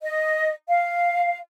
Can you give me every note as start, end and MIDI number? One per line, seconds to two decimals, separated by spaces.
0.02 0.52 75
0.68 1.38 77